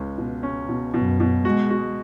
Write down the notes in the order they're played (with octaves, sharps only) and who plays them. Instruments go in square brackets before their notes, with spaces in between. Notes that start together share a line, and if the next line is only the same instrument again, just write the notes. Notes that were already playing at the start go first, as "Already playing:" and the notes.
Already playing: [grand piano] C#2 G#3 C#4
B2
C#4
B2
[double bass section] F#2 [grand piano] B2
[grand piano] B2
[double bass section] G#3 [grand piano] F#4
[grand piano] F#4